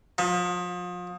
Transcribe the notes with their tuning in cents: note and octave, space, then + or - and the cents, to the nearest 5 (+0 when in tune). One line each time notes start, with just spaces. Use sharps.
F3 +35